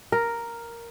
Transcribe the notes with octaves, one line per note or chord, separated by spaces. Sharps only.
A#4